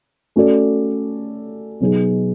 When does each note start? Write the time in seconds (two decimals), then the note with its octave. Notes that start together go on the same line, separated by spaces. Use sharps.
0.36 A3 C#4 F#4 A4 D5
1.81 B2 F#3 B3 D#4 G#4